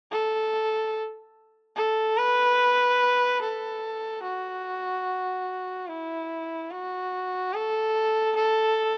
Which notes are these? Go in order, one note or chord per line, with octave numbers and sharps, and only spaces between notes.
A4
A4
B4
A4
F#4
E4
F#4
A4
A4